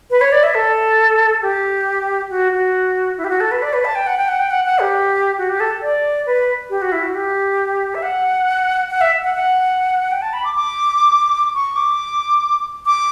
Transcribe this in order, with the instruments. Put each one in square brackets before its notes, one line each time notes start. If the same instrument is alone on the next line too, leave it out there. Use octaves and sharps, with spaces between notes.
[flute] B4
C#5
D5
E5
A4
G4
F#4
F#4
E4
G4
F#4
A4
B4
D5
B4
A5
G5
F#5
G5
F#5
G5
F#5
F#5
G4
F#4
G4
A4
D5
B4
G4
F#4
E4
F#4
G4
E5
F#5
F#5
E5
F#5
F#5
G5
A5
B5
D6
D6
C#6
D6
D6